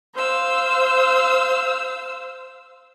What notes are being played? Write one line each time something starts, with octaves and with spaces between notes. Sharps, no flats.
C5 F5 E6